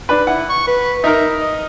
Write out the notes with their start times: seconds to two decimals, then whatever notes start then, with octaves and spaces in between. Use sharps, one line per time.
0.09 D4 B4
0.27 E4 F#5
0.50 C#6
0.68 B4
1.04 D#4 A#4 E5
1.40 D#5